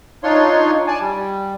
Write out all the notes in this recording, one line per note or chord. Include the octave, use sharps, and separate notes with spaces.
D4 D#4 F4 C#5 C6
D5 G#5 A5
G3